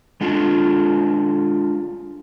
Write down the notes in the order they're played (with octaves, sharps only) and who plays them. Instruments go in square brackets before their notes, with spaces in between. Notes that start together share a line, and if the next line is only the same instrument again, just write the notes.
[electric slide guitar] G#3 D4 F4